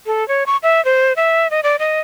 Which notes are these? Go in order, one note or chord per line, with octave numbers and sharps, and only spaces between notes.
A4
C#5
C#6
E5
C5
E5
D#5
D5
D#5